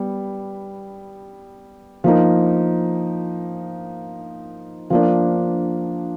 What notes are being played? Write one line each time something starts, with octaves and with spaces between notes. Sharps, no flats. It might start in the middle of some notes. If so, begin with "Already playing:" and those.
Already playing: G3 B3
F3 A#3 D#4
F3 A#3 D4